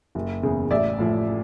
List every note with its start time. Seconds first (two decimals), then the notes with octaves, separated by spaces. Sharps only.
0.15 F#1
0.43 E2 C#3
0.70 A1 D5 E5
0.99 A2 F3